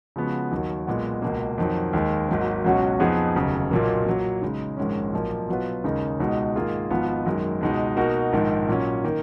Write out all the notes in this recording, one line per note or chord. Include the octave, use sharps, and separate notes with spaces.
C#3 F3 G#3 B3 F#4
D#2 D#3 F#3 A#3
B1 A#2 G#3 B3 F#4
C#2 B2 A#3
F2 D#3 F#3
D#2 D#3 G#3
G#1 G#2 F#3 A#3
C#2 B2 F#3 C#4 F#4
F2 F3 B3 D#4 G#4
F1 D#2 C#3 F#3
B1 A#2 F#3 A#3
A#2 F#3 A#3
C#3 G#3 D#4
A#1 G#2 D#3 G#3 C#4
B1 A#2 F3 A#3
B2 F#3 B3 F4 B4
D#2 C#3 G#3 D#4 A#4
C#2 B2 G#3 D#4
G#2 D#3 A#3 F4 G#4
G#1 G#2 F3 B3 F4
F#2 D#3 G#3
C#2 B2 G#3 D#4
B2 A#3 D#4 F#4 A#4
A#1 G#2 D#3
A#2 F#3 C#4
D#3 A#3